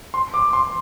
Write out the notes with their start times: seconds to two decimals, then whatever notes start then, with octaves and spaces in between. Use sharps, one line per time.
0.14 C6
0.34 D6
0.53 C6